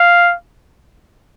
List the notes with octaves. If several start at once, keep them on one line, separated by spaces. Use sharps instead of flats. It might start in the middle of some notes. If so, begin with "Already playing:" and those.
Already playing: F5